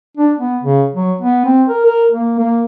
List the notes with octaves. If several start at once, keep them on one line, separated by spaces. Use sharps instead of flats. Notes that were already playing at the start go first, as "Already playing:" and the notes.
D4
B3
C#3
F#3
B3
C4
A#4
A#4
A#3
A#3